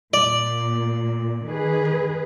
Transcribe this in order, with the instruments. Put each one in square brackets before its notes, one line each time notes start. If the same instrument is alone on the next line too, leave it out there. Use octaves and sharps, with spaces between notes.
[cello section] A#2 [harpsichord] D5
[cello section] D#3 G#4 B4